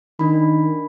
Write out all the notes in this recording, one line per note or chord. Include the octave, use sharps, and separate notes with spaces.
D#3 D4 B5